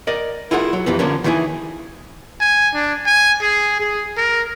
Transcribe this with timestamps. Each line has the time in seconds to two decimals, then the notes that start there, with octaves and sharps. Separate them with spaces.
0.07 A#4 D5 D#5
0.51 E4 F4 G#4 A#4 F#5
0.73 F#3
0.86 F2 C3 E3 B3
0.99 D3 F3 A#3 C#4
1.24 D#3 E3 E4 F#4 G#4
2.41 G#5
2.74 D4
3.06 G#5
3.41 G#4
3.80 G#4
4.17 A#4